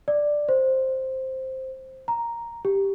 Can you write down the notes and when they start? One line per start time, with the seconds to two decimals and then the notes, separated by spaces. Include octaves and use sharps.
0.08 D5
0.49 C5
2.08 A#5
2.65 G4